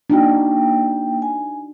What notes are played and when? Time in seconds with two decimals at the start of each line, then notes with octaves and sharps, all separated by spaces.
0.10 A#3 D4 D#4 F#4 G5
1.22 G#5